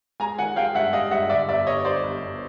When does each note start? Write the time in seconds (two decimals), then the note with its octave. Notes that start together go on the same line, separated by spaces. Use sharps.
0.20 G#3 G#5 A#5
0.38 D#3 F#5 G#5
0.56 G#3 F5 G5
0.75 G2 E5 F#5
0.93 G#3 D#5 F5
1.11 G2 E5 F#5
1.30 D3 D5 E5
1.49 G1 D5 E5
1.66 G1 C#5 D#5
1.85 G2 C5 D5
2.04 G1
2.22 G1